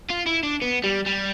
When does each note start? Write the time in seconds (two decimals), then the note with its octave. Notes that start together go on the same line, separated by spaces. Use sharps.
0.10 F4
0.26 E4
0.43 D4
0.62 B3
0.84 G3
1.06 G3